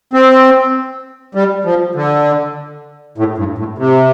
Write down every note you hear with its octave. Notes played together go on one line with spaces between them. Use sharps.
C4
G3
F3
D3
A2
G2
A2
C3